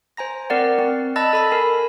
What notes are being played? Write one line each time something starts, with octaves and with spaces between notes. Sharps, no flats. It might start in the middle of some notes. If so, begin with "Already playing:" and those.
C5 G#5 A#5 A#6
C4 A#4 D5 F#5
C4
D#5 A5 B5 E6 F#6 A6
A4 B5 E6
A#4 G#5